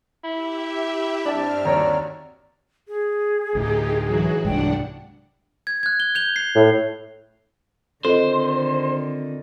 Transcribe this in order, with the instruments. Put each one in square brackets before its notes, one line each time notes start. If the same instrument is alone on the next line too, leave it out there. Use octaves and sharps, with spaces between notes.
[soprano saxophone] E4 [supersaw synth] G4 E5
[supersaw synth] G2 C4 F6 [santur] D4 A5
[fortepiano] D#2 C#5 D5 [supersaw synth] F#4 [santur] A#5
[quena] G#4
[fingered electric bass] D2 A2 [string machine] D#4 G4
[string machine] E3 F#3 F#4
[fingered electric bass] C2 G#2 [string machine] D4 F#5 [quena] G5
[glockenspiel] G#6
F#6 G#6
G7
G6 F7 G7
C7
[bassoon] A2
[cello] D3 D#3 [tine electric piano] C4 F4 [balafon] A4 D#5 [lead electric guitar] C5